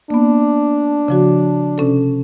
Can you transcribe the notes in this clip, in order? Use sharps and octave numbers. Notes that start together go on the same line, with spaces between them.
A#3 B3 D4
C#3 F3 F#4
C3 C#4 A4